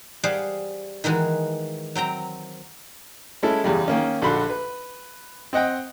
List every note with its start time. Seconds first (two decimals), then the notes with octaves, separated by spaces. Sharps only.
0.23 G3 G#4 C5 F5 F#5
1.04 D#3 E3 G#3 F#4
1.95 F#3 C4 G5 A#5
3.43 G#3 C#4 E4 A4
3.64 E2 C#3 G3
3.88 D#3 A#3 C#4
4.22 A#1 D3 F#4 B5 C6
4.49 B4
5.53 C4 D#5 F#5 G5